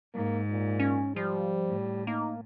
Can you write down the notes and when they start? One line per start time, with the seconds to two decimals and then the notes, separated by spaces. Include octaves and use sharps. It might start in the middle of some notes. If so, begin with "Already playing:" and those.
0.14 G#2 A#3
0.50 A#2
0.79 C#4
1.16 F3 G3
1.66 A2
2.07 A#3 D#4